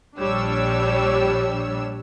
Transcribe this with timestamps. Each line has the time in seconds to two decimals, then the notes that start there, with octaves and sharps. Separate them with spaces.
0.19 A#1 G3 D4 C#5 E6